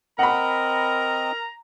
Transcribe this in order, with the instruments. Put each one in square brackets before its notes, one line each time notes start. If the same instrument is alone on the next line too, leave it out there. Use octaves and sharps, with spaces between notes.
[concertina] C4 D#5 [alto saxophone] A#4 [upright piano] F#5 B5 [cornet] A#5